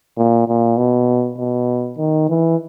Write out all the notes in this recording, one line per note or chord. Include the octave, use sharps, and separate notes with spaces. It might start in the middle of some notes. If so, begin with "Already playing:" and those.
A#2
A#2
B2
B2
D#3
E3